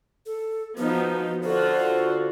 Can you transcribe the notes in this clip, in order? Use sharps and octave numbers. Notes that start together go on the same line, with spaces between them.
A4
F3 B3 D#4 F#4
D3 F4 F#4 C5